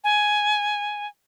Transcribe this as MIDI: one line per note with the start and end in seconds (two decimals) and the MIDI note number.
0.04 1.07 80